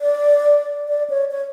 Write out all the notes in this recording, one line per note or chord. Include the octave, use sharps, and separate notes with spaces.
D5
D5
C#5
C#5